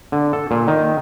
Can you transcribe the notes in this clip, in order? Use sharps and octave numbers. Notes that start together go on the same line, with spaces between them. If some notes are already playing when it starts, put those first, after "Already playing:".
D3
A4
A#2
D#3